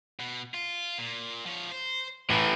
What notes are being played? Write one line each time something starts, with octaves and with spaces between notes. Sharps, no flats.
B2
F4
A#2
F3 C#5
C5
A2 E3 G#4 F#5